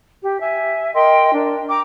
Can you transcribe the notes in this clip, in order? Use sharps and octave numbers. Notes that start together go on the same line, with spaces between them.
G4
E5 G#5
A#4 D#5 G5 C6
D4 A#4
G5 A#5 D6